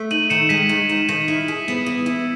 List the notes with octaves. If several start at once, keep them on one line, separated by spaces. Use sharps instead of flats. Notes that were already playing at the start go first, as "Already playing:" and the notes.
Already playing: A3
D#4 D#7 F#7
D#3 C#7 E7
G#3 B6 D#7
D#3
D#4
D#3
E4
G#4
B3
E3
E4